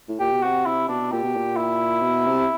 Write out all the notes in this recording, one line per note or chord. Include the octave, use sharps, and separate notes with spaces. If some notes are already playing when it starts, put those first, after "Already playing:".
A2
A#2 G4
B2
C3 F#4
C3 E4
B2 D4
A#2 G4
B2
A#2
E4
B2
C3